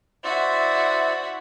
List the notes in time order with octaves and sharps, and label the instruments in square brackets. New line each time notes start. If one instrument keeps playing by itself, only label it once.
[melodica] E4 C5 D5 [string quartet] F#4 E5